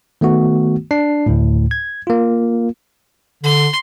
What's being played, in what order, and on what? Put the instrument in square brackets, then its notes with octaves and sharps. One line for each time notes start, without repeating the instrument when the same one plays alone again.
[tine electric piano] D#3 A3 B3 F#4
D4 C7
D2 A2
G#6
A#3 F4
[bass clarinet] D3 [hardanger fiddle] C6